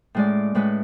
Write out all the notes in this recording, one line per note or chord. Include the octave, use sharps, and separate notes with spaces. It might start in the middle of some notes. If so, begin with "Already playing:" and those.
A2 G#3 C#4 D5
A2 G#3 C#4 B4